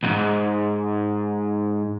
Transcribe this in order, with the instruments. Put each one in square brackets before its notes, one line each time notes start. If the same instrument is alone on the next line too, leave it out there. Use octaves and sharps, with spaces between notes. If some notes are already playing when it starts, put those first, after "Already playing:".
[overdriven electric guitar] C#2 G#2